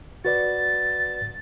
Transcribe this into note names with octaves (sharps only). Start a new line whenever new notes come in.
F#4 B4 D5 A6